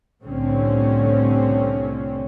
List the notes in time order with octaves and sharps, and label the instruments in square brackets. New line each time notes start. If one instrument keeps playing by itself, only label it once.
[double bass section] C2 A2 D3 A3 C4 C#4